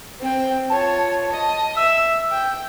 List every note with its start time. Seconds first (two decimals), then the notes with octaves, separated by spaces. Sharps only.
0.20 C4 G5
0.70 F4 C#5 A5
1.32 D#5
1.77 E5 E6
2.31 G5